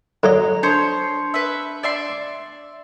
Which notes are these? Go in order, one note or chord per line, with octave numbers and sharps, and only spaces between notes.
D3 F#3 D#5 A#5
D4 C5 C#5 C#7
B4 E5
D5 E5 C6